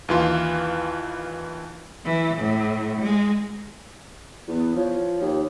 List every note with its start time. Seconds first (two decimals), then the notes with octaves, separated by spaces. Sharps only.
0.09 D#2 E3 F4
2.05 E3
2.37 A2
3.02 G#3
4.48 E2 B3
4.76 F3 C#5
5.21 D#2